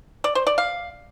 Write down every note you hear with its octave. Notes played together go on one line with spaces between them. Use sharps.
D5
C5
D5
F5